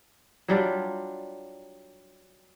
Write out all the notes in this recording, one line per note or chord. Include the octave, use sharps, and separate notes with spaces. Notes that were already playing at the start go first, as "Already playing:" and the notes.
F#3 G3 D4 F4